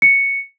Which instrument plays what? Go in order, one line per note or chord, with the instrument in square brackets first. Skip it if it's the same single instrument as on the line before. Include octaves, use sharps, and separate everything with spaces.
[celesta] C#7